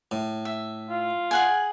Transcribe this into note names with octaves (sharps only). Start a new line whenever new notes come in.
A2
E5
F4
G#4 F#5 G#5